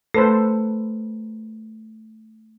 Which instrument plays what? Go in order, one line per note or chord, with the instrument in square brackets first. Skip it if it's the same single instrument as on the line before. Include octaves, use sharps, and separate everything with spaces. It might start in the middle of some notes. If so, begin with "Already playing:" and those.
[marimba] A3 [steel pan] A4 B4 C5